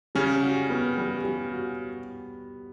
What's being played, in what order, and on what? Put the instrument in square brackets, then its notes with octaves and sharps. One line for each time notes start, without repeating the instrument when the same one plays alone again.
[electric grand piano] C#3 C#4 [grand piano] G3
[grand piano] F#4
B3
G3
G3
F#4